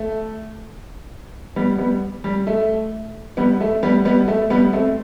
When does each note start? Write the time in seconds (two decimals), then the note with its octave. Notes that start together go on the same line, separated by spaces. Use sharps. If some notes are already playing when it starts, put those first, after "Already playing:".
Already playing: A3
1.56 G3 B3
1.78 G3 B3
2.24 G3
2.47 A3
3.37 G3 B3
3.61 A3
3.83 G3 B3
4.05 G3 B3
4.28 A3
4.50 G3 B3
4.73 A3 C4